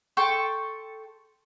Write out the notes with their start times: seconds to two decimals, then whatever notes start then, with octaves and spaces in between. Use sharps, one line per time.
0.17 A4 G5 C6 C#6